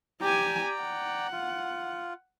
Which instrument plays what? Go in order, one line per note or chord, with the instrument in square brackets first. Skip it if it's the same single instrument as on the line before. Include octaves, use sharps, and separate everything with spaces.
[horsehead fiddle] G4 G#5 [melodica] D5 G5 A#5
[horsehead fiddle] F#5
[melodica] F4